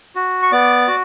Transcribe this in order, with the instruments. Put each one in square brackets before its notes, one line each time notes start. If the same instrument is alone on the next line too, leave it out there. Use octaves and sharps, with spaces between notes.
[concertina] F#4
C#6
B3 D5 D6
F#4